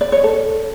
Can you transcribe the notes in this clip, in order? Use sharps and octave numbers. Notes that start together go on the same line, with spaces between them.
D5
C#5
A4